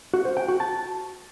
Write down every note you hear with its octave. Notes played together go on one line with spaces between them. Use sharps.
F#4
C5
G5
F#4
A5